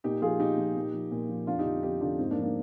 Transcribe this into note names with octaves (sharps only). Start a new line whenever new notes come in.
A#2 D#4 G4
F3 F4 G#4
A#2 D#4 G4
F3
A#2
F3
A#2
F3
F2 D4 F4
D#4 G4
D3 F3
F2 D#4 G4
D3 F3 D4 F4
G#2 C4 D#4
A#3 D4
F3
A#3 D4